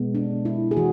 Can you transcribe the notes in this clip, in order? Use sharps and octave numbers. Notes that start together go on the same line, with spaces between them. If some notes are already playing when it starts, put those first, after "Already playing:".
Already playing: B2 G#3 B3
D4
E4
G#4
E3 F#4